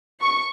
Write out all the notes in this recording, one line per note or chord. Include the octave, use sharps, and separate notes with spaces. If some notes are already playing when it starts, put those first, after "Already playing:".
C#6